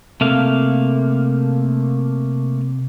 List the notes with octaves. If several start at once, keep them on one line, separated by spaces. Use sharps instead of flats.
C3 A3 A#3 F5